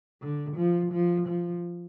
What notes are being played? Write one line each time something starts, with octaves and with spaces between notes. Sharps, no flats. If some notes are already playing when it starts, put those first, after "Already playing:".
D3
F3
F3
F3